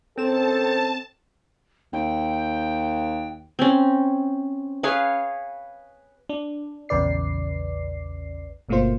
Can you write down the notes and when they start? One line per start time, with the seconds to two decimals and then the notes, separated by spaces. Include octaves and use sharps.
0.18 D#3 C4 C#4 A4 C5 A5 E7
1.93 D#2 G5
3.59 C4 C#4
4.83 G#4 B4 C#5 F5
6.29 D4
6.89 A#1 E2 C#3 B4 D5 C7
8.69 G1 B2 A3 A#3 F4 C5